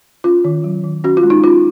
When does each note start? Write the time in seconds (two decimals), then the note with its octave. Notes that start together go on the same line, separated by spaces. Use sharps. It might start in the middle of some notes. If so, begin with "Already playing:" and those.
0.24 C#4 F4
0.45 D#3
0.64 F#3
0.84 D#3
1.04 C#4 F#4
1.17 F4
1.23 G#3
1.30 D#4
1.44 C#4 F4